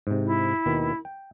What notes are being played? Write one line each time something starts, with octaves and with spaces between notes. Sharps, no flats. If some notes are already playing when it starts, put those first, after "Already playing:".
G#2 C3
E4
D#2 B2 D#3
G5